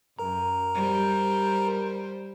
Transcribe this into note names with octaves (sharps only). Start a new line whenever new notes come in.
F#2 A#4 A#5
G3 C5